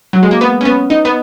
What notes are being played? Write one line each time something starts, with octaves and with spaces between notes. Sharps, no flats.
F#3
G#3
A#3
B3
C#4
B3
D#4
B3